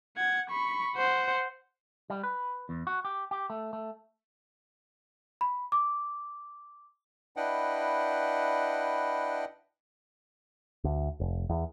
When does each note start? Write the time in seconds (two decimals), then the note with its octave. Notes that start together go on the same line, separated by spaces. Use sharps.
0.17 F#5 G#6
0.50 B5 C#6
0.96 C5 F#5
2.10 G3
2.23 B4
2.69 E2
2.87 F#4
3.05 G4
3.31 G4
3.50 A3
3.73 A3
5.41 B5
5.72 D6
7.37 D4 E4 B4 D#5 F#5 G5
10.84 D2
11.20 F1
11.49 E2